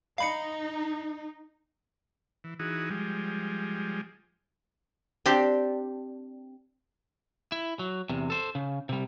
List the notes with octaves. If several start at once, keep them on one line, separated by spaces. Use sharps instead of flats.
D#4 F5 B5 C#7
E3
E3 D#4 F#4 G#4
F3 G3 G#3
C4 D4 G4
E4
F#3
E2 C3
A4 C5
C#3
C3 G3